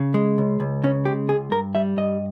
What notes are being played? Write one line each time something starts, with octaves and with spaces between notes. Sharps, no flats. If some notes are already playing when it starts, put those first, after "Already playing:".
Already playing: C#3
G#3
C#2
C#2
C#3 C#4
G#3 G4
C#2 G#4
G2 A#4
G3 E5
G2 D#5